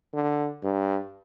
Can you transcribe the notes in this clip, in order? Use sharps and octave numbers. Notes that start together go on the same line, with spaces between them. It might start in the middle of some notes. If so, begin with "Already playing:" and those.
D3
G2